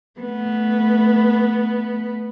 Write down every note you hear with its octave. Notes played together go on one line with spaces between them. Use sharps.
A3 B3